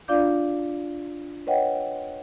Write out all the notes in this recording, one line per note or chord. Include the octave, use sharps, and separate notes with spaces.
D4 F4 D5 F5 D6 G6
B4 C#5 D#5 F#5 G5